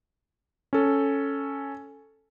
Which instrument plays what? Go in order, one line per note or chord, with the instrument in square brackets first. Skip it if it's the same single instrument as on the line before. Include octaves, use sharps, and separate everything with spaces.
[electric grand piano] C#4 A4